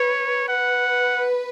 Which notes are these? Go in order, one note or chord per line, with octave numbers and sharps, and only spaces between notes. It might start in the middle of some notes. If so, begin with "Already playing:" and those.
Already playing: B4 C#5
B4 F#5